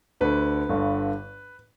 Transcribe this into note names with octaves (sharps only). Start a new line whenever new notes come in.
D2 D3 B4
G1 G2 D3